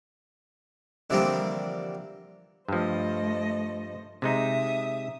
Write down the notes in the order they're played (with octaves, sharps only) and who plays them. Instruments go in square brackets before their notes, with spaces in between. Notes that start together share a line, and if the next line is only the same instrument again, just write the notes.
[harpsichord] D3 E3 F3 G3 A#3 C4
[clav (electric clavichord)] G2 F3 [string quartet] A3 C5 D#5
[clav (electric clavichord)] C3 G#3 D#4 [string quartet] E5 D#6